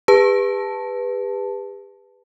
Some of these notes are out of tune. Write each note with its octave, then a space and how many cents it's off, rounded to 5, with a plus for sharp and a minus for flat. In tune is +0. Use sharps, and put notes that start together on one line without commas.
G4 +45 B4 +0 A5 +0